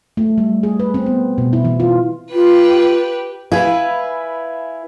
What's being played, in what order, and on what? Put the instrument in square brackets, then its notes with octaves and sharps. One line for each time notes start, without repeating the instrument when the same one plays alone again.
[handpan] A3
G3
G#4
B4
C4
B3
B2
E4
E3
F4
[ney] F4 [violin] G4 B4
[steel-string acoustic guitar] E4 B4 [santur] F5 G#5